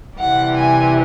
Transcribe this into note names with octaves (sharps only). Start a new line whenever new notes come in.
C3 E3 G3 F#5
G#5